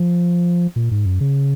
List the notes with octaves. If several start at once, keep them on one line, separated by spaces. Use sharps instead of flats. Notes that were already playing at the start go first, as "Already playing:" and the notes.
Already playing: F3
A#2
G#2
F#2
C#3